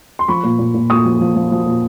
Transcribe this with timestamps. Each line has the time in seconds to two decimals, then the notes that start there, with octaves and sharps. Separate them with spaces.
0.19 C6
0.28 F3 B5 C#6
0.43 A#2
0.59 A#2
0.74 A#2
0.90 A#2 C#6 D#6
1.05 F3
1.21 F3
1.36 F3
1.51 F3
1.66 A#2